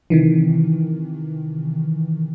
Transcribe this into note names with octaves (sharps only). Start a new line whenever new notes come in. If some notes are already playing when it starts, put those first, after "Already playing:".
C3 D#3 E3